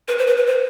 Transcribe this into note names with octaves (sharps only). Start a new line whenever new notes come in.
B4
C5
B4
B4
C5